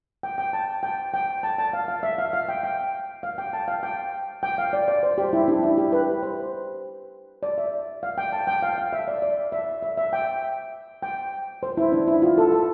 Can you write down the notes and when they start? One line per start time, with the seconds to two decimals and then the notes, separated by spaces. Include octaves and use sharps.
0.23 G5
0.38 G5
0.53 A5
0.83 G5
1.14 G5
1.43 A5
1.58 A5
1.73 F5
1.88 F5
2.03 E5
2.18 F5
2.33 F5
2.49 G5
2.63 G5
3.23 F5
3.38 G5
3.53 A5
3.68 F5
3.83 G5
4.43 G5
4.58 F5
4.73 D5
4.88 D5
5.03 C5
5.18 G4
5.33 E4
5.48 D4
5.63 E4
5.78 G4
5.93 B4
6.23 C5
7.43 D5
7.58 E5
8.03 F5
8.18 G5
8.33 A5
8.47 G5
8.63 F5
8.78 F5
8.93 E5
9.08 D5
9.22 D5
9.52 E5
9.82 E5
9.98 E5
10.13 G5
11.03 G5
11.63 C5
11.77 E4
11.92 D4
12.07 E4
12.22 F4
12.38 A4
12.52 A4